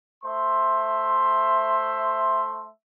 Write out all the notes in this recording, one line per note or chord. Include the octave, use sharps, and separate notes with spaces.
A3 C5 E5 C6